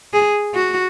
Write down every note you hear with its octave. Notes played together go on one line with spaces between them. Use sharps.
G#4
F#4